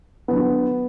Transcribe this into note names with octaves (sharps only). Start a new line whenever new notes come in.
D3 F#3 B3